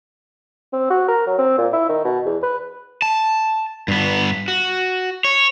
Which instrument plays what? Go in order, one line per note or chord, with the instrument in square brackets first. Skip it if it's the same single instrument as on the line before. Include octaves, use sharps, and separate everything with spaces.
[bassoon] C4
F#4
A#4
F#3
C4
A#2
E4
D#3
B2
E2
B4
[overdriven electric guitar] A5
G2 B3
F#4
C#5